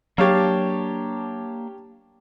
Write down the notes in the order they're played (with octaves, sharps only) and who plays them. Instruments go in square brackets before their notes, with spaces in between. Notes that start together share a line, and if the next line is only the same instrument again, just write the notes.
[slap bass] F#3 [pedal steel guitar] A#3 D4 A5 [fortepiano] G4 C#5 F5